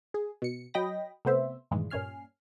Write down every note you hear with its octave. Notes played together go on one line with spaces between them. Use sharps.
G#4
B2 C#7
F#3 D#5 G5 B5 A#6
C3 A3 B3 C5 E5
G2 A#2 D#3 E3 G#3
G2 A#2 C#4 G#5 F6 C7